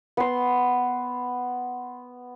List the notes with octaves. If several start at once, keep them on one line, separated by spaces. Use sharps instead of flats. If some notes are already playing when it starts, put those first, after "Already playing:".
B3 C6